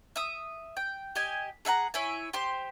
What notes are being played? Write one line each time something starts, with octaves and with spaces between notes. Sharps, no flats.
E5 D#6
G5
G4 D#5 G#5
G#4 E5 F#5 A#5
E4 C#5 E5 G#5
G4 C5 C6